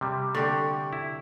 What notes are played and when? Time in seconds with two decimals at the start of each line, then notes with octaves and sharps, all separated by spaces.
0.01 C3 G3
0.35 D3 G4 C#6 D6
0.93 E4